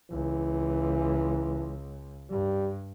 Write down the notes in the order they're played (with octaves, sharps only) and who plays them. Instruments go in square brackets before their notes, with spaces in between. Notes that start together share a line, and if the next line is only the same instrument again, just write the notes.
[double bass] C#2 [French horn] E3
[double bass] G2 [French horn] G3